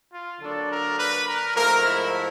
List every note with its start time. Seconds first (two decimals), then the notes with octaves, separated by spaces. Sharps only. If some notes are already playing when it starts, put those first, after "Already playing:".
0.12 F4
0.40 D3 F#3 A#3 D4 A4
0.70 A#4
0.98 B4
1.27 A#4
1.55 G#2 F3 A3 A#4
1.84 E4